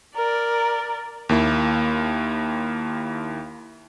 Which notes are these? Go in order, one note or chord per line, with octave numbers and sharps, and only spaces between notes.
A#4 D5
D#2 A#3 E4